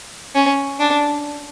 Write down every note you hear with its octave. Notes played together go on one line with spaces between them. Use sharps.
C#4
D4